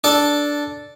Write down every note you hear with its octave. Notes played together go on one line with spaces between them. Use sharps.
D4 A4